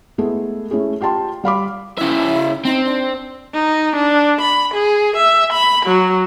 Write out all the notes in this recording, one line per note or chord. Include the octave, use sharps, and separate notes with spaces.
G#3 A3 B3 E4 G#4 A4
A3 C#4 E4 G#4
F4 G4 G5 A5 C6
G3 F5 B5 D6
C#3 E4 E5
C4 D#4
D4
D#4
D4
B5
G#4
E5
B5
F#3